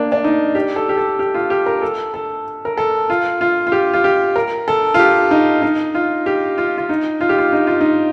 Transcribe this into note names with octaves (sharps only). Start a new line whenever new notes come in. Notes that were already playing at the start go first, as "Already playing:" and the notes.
Already playing: A#3 D4
D4
D#4
G4
A4
G4
A4
G4
F4
G4
A#4
A4
A4
A#4
A4
F4
F4
F4
G4
F4
G4
A#4
A4
F4
G4
D#4
D#4
F4
G4
F4
F4
D#4
F4
G4
F4
D#4
F4
D#4